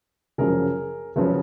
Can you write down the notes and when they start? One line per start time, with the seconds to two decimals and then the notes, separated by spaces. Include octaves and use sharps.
0.38 F#1 F#2 C#3 F3 G#4 A#4
1.16 F#1 F#2 C#3 F3 B4 C#5